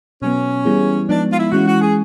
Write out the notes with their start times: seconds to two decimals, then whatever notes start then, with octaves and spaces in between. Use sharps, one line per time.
0.22 B2 F#3 B3 C#4
0.65 E3 G3 B3 E4 G#4
1.09 F3 G#3 B3 D4 D#4
1.32 F4
1.39 E4
1.52 E3 G#3 C#4 E4 F#4
1.68 F#4
1.81 G#4